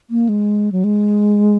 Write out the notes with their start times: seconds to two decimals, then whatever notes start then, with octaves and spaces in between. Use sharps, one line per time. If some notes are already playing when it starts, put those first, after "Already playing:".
0.10 A#3
0.29 G#3
0.72 F#3
0.84 G#3